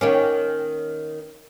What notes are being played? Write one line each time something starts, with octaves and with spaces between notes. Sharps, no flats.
D#3 A#3 C#4